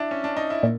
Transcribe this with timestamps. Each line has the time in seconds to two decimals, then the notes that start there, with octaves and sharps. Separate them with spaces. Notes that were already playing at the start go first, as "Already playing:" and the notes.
Already playing: D4 E4
0.11 C#4
0.24 D4
0.37 D#4
0.50 E4
0.63 A#2